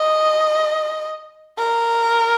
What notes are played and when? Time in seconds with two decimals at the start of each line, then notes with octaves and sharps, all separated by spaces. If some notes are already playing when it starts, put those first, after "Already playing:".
Already playing: D#5
1.58 A#4